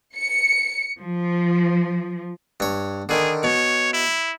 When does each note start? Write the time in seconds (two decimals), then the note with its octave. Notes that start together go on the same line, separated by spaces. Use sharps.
0.17 C#7
0.99 F3
2.60 G2 C#5
3.09 D3 D#3 G#4
3.43 B2 C#5
3.93 E4